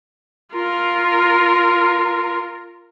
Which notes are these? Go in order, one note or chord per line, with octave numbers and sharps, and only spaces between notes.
F4 A#4